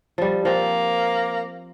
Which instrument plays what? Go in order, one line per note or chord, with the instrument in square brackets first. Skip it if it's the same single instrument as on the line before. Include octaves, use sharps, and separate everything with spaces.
[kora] F3 G3
[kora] F3 C4 [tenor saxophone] A#3